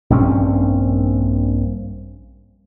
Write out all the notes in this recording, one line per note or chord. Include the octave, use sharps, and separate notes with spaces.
A#1 G2 C4 C#4